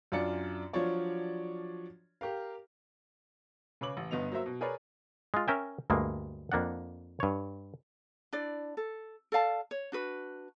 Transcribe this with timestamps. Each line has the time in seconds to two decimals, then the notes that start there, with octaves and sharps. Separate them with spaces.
0.12 F#2 D4 F4 D5 C#7
0.73 F3 F#3 D4 F4 C#5 D5
2.21 G4 A#4 F5
3.81 C#3 B4 C#5 D6 F#7
3.97 A1
4.11 G1 G2 B3 D#5 F7
4.32 F#3 A#3 C5 E5
4.46 B2
4.61 G#4 A#4 B4 C#5 D5
5.34 G#3 F4
5.48 C#4 A#4 E5 G5 G#5
5.90 D2 G2 G#3 A#3
6.52 F2 A#3 D4 F#5
7.20 G2 C#5
8.33 D4 E4 D5
8.77 A4
9.32 A4 D5 F5 A5
9.71 C#5
9.92 D4 F#4 B4